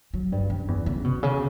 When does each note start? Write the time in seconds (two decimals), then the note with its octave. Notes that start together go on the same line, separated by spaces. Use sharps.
0.14 F#3
0.32 G2
0.50 F#2
0.68 E2
0.86 C#3
1.04 B2
1.23 C#3